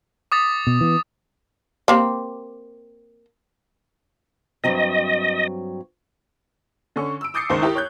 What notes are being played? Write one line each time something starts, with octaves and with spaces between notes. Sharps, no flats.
D6 D#6 A6
B2
E3 B3
A#3 C4 G4
G2 F#3 C4 D#5
D3 C#4 C#6
E6 D7
D6 D#6 G6 A6 C7 C#7
C#2 D#3 C5 C#6
E4 G4 A#4
C#5 F#6 G6